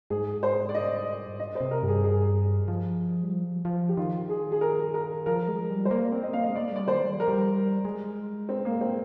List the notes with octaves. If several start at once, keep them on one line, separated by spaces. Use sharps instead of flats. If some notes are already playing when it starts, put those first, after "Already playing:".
G#2 G#4
C5
D5
D#5
D#5
C5
C3
A#4
G2 G4
G#4
G#4
F3
G3
F3
F3
G4
D#3 F4
G#4
G#4
A#4
A#4
F3 A#4
G#3
G3
C5
A#3 D5
C4
D#5
A#3 F5
G#3 D#5
A#3 D5
G3 D5
D#3 C5
G3
F3 A#4
G3
G#3
C4
A#3
C4